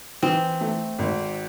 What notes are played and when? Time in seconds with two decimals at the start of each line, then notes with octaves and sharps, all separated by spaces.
0.22 E3 C4
0.61 A3
0.99 G#1